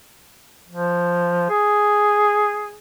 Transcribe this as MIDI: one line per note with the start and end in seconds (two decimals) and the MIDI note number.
0.69 1.49 53
1.49 2.78 68